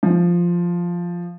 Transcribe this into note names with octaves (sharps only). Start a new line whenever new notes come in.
F3